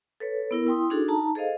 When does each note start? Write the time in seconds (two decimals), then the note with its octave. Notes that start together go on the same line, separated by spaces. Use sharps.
0.20 A4 B4 C#5
0.51 B3 E4 A#4
0.67 E4 G5 C6 D#6
0.90 D4 D#4 F#4 G#4 A4
1.08 D#4 A5 A#5
1.35 G#4 A4 C5 D#5 F5